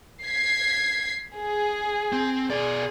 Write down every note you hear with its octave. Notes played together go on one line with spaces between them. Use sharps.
G#6 B6 C7
G#4
C4
B2 G#4 D5